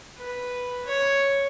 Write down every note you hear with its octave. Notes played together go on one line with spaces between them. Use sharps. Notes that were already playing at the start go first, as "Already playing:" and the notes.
B4
C#5